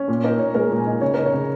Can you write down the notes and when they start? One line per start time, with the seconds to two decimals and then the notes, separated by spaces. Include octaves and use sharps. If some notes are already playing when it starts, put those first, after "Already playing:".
Already playing: C#4
0.08 A#2
0.24 D#4 A#4
0.39 A#2 C#5
0.55 G#3 A#4
0.71 A#2
0.78 G#5
0.87 D#4
1.01 C#3 C#5
1.14 D#4 A#4
1.26 C#5
1.33 C#3